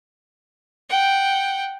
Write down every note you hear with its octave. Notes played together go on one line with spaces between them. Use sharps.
F#5 G5